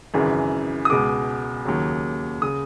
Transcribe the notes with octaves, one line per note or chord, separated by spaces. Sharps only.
G#1 F#2 C#3 E3 G#3
D#6
C#2 B2 G#3 D6
D#2 C#3 F#3
C#3 D#6